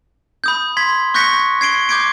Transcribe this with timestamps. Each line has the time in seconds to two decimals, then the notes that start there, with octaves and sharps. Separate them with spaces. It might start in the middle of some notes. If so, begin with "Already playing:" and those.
0.44 B5 D#6 G6
0.77 C6 G#6 B6
1.14 C#6 F#6 G6 A#6 B6 C#7
1.61 G#6 C7 D7 G7
1.89 D6 G6 G#6 C7 D7